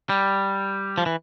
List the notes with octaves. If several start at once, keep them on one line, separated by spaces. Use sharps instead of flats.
G3
F3
E3